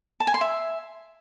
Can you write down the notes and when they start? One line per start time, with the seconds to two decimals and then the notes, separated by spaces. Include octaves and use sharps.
0.20 A5
0.27 G#5
0.34 C6
0.41 E5